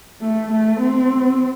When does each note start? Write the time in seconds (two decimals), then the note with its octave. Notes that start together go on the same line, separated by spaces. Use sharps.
0.21 A3
0.51 A3
0.80 C4